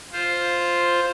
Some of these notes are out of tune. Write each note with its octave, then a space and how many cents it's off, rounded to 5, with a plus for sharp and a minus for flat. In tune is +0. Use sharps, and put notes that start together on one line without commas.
F4 +0 C5 +0